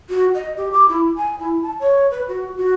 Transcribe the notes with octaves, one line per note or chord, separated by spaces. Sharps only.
F#4
D#5
G4
D6
E4
G#5
E4
A5
C#5
B4
F#4
F#4